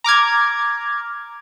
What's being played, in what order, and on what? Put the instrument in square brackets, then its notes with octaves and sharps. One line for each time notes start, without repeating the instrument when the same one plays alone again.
[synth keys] A#5 D6 F6 G#6